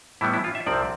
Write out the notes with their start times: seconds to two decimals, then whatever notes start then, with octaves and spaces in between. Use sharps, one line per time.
0.21 A2 E3 G3 B3 E4
0.33 E4
0.44 F4
0.55 E5
0.66 C2 C3 F3 C4 D5